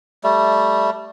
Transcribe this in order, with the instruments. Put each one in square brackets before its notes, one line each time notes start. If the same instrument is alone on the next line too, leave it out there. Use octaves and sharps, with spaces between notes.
[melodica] G3 A3